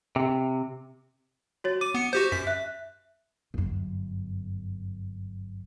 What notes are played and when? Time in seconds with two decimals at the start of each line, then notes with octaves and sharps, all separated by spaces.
0.16 C3
1.64 F#4 C#5 A6
1.81 D6 D#7
1.94 B3 C#7
2.13 F#4 G4 C5 G6
2.32 F#2 B6
2.47 E5 F#6
3.54 G1 F#2